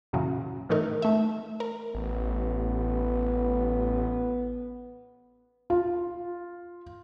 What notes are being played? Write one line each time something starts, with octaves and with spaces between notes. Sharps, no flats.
F#2 A#2 C#3 E3 F#3
A2 E3 A3 D#4 A#4
A3 E5
A#4
A1 B3
F4